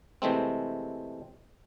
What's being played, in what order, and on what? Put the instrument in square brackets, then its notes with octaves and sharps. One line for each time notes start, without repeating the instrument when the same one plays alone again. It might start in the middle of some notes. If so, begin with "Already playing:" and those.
[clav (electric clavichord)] C3 E3 G#3 A3 C4